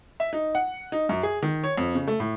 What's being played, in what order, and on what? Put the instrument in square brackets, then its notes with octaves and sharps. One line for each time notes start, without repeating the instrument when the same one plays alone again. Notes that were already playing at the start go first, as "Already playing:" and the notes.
[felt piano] E5
D#4
F#5
D#4
F#2
G#4
D#3
C#5
F2
C#3
A3
A2